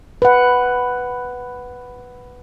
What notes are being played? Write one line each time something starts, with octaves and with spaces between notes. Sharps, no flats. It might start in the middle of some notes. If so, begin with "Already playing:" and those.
B4 F#5